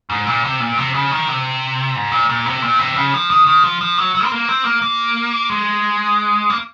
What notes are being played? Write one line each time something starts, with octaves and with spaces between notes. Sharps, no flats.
G#2
A#2
C3
A#2
C3
C#3
D#3
C3
G#2
A#2
A#2
C3
A#2
C3
C#3
F3
D#3
D#3
F3
F3
F#3
F#3
C4
A#3
C4
A#3
A#3
G#3
A#3